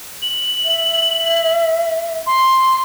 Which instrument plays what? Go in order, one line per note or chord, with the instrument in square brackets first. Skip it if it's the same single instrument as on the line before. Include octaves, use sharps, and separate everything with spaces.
[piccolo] F#7
[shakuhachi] E5
[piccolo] C6